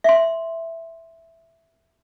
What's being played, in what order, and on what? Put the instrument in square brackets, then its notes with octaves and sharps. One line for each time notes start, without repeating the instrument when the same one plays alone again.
[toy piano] E5 C6